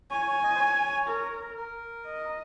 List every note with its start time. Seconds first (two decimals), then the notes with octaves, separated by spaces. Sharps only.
0.10 C#5 G#5
0.27 C#5
0.43 D#5
0.55 C5
0.60 C#5
1.08 A#4
1.57 A#4
2.05 D#5